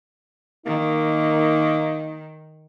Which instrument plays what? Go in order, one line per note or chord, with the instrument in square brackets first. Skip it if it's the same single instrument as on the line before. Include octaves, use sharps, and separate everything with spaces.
[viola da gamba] D#3 [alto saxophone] A#3 [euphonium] D#4